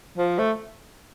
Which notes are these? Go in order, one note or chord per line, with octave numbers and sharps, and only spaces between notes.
F3
A3